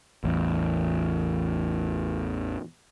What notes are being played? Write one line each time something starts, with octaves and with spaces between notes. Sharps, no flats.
A1 E2